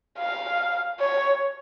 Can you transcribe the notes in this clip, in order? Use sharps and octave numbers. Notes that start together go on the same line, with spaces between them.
F5
C#5